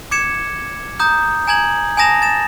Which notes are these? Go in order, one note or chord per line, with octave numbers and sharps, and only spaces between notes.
D6 G#6 C#7 E7
A#5 D#6 G6
G#5 A#5 G#6 F#7
G#5 A5 D#6 A#6 E7 F7
A6 E7